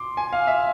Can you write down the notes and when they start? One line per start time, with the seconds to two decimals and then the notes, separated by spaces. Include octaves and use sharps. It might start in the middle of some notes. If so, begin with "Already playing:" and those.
Already playing: C6 D6
0.17 G#5
0.33 F5
0.47 E5